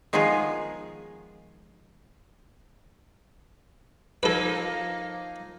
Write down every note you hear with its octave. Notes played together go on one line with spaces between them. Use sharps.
D#3 F3 G#3 B3 F4 G#4
F3 A#3 D#4 A4 B4